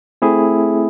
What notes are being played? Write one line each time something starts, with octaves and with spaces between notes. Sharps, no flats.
A3 C4 E4 G#4